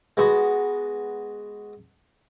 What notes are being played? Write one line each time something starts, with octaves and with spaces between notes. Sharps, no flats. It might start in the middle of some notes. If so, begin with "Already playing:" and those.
G#3 B3 F#4